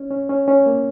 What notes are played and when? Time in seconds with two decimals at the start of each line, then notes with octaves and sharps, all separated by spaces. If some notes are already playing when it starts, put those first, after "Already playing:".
Already playing: C#4
0.11 C#4
0.29 C#4
0.48 C#4
0.66 A#3